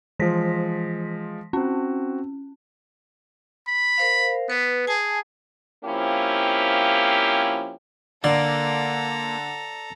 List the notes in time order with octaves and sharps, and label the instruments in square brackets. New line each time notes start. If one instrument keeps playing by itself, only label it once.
[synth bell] E3 A#6 B6 [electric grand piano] F3 G#3
[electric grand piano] C4 F#4 [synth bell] C#4
[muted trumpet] B5
[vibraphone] A#4 C5 F5
[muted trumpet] B3 [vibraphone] B4
[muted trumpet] G#4 [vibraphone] G#5 A5
[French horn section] F3 A#3 C4 C#4 E4 G4
[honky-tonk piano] D3 [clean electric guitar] A#3 [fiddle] A4 A#5 [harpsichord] D5